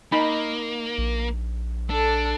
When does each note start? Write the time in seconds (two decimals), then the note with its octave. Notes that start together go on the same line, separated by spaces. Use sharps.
0.12 A#3 D#4 B5
0.98 A#1
1.90 D4 A4